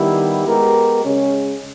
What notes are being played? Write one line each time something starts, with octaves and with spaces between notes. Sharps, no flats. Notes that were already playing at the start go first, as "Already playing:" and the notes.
Already playing: D#3 G3 B3 E4 G4
G#3 B3 G4 A#4
C#3 G#3 C#4